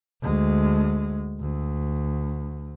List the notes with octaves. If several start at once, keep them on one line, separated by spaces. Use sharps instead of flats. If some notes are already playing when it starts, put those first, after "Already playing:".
D2 G#3
D2